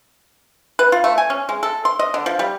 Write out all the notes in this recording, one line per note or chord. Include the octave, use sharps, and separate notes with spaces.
B4
F4
A3
G#5
C#4
G#3
A4
C6
D#5
D3
F3
G3